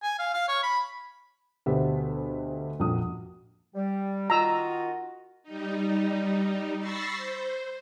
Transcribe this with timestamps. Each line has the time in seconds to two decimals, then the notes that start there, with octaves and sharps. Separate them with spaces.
0.03 G#5
0.19 F5
0.34 F5
0.48 C#5
0.63 B5
1.66 D2 B2 B3 G4 C5 E5
2.80 A#1 F2 F#4 D#6
3.75 G3 G4
4.30 D#3 F4 F#4 D#5 A#5 E6
5.43 G3 D#4
6.79 B5 C#6 E6 A6 A#6 C7
7.15 C5